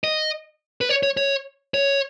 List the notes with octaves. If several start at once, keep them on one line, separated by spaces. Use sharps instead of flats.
D#5
B4
C#5
C#5
C#5
C#5